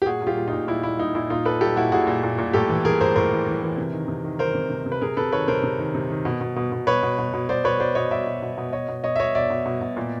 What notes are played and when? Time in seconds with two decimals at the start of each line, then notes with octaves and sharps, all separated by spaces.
0.02 G4
0.06 A#2 F#4 G#4
0.22 A#2
0.27 F4 G4
0.37 A#2
0.48 D#4 F4
0.53 A#2
0.68 A#2 E4
0.83 A#2 E4
0.99 A#2 D#4
1.15 A#2 E4
1.30 A#2 D#4 F4
1.45 A#2 A4 B4
1.61 A#2 G4 A4
1.76 A#2 E4 F#4
1.92 A#2 F#4 G#4
2.07 A#2
2.23 A#2
2.38 A#2
2.53 A2 G4 A4
2.69 E3
2.85 E3 G#4 A#4
3.00 A2 A#4 C5
3.16 A2 A#4 C5
3.32 E3
3.47 E3
3.62 E3
3.78 C3
3.93 D#3
4.08 C3
4.24 D#3
4.39 D#3 A#4 C5
4.55 C3
4.70 C3
4.86 C3
4.92 B4
5.01 C3 G#4 A#4
5.17 C3 A4 B4
5.32 D#3 B4 C#5
5.48 C3 A#4 C5
5.63 C3
5.79 D#3
5.95 C3
6.10 D#3
6.25 B2
6.41 B2
6.56 B2
6.72 B2
6.87 B2 B4 C#5
7.03 B2
7.18 B2
7.34 B2
7.49 B2 C5 D5
7.64 B2 B4 C#5
7.80 B2 C5 D5
7.95 B2 C#5 D#5
8.11 B2 D5 E5
8.27 B2
8.42 B2
8.58 B2
8.73 B2 C#5 D#5
8.88 B2
9.04 B2 C#5 D#5
9.16 E5
9.19 B2 C#5 D#5
9.35 B2 D5 E5
9.50 B2
9.66 B2
9.81 B2
9.97 A#2